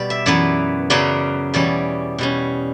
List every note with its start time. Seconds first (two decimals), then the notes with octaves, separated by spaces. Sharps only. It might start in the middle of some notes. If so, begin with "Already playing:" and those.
Already playing: B2 G3 B3 D5
0.10 E5
0.26 F#2 E3 B3 D5
0.90 F#2 C#3 F#3 B3 D5
1.54 E2 B2 G3 C#4 D5
2.18 B2 G3 C#4